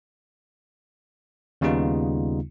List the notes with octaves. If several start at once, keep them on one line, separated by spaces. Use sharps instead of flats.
D#2 C#3 G3 B3 D#4 F4